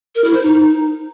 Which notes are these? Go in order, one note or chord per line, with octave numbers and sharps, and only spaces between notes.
A#4
E4
C5
D#4